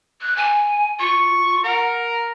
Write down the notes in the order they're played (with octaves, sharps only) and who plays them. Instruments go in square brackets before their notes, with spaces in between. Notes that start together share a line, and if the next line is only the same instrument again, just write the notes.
[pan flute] F#6
G#5
[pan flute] F4 [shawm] C#6
[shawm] A#4 [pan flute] F#5